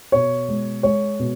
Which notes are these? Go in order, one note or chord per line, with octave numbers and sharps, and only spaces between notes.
B2 C#5
G#3
G#3 C#5
B2